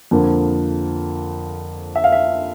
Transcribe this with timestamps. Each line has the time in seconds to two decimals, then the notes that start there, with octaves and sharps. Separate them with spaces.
0.11 F2 D3 F3 A#3
1.96 E5
2.04 F5
2.12 E5